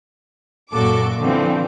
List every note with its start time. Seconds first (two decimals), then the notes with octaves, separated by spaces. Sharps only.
0.73 F#2 A#2 F#4 A4 D6
1.21 D3 E3 F3 C4